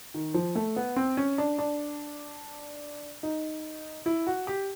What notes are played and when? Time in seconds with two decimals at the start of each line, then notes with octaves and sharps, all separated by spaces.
0.14 D#3
0.34 F3
0.56 A3
0.76 B3
0.96 C4
1.17 C#4
1.38 D4
1.58 D4
3.23 D#4
4.06 E4
4.27 F#4
4.47 G4